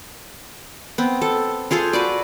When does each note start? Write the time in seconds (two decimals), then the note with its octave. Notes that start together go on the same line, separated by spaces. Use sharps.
0.98 B3 C4
1.22 A4
1.71 F4 G#4 A4 C5
1.93 F#4 B4 D5